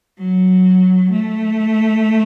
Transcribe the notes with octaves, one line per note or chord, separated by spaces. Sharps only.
F#3
A3